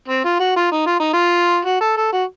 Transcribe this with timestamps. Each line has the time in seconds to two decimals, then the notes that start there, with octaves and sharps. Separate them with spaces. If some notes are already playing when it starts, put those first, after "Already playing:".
0.08 C4
0.25 F4
0.40 F#4
0.56 F4
0.72 D#4
0.86 F4
1.00 D#4
1.13 F4
1.65 F#4
1.81 A4
1.97 A4
2.13 F#4